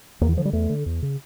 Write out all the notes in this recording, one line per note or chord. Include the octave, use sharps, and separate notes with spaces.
E2 A#3
E3
D3 F3
G3
E2 A3
D3
E2
C#3